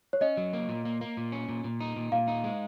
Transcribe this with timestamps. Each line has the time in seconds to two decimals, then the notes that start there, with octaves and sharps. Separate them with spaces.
0.13 C#5
0.21 C#4 D#5
0.37 F#3
0.53 A#3
0.69 A#2
0.85 A#3
1.01 A#3
1.17 A#2
1.32 C#4
1.49 A#2
1.64 A#2
1.80 D#4
1.96 A#2
2.12 A#2 F5
2.28 D#4
2.44 G#3